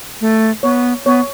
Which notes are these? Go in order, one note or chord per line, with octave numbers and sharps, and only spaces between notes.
A3
B3 C#5
B3 C#5